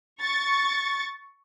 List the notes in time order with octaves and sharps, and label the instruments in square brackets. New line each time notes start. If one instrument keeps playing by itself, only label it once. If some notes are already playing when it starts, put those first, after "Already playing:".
[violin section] C#6 A6